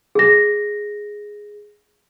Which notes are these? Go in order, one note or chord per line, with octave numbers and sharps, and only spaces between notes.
G#4 A#6